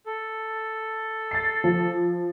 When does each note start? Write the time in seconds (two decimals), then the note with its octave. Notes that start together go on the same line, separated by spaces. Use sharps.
0.06 A4
1.31 A6 C7
1.64 F3